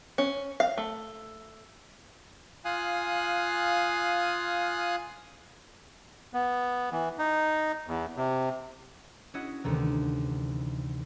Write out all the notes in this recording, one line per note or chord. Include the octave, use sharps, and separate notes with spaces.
C#4
F5
A3
F4 F5 G#5 D#6 F#6
B3
E3
D#4
E2
C3
C#4 E4 F#4 D#5 F#5
D2 C3 D#3 E3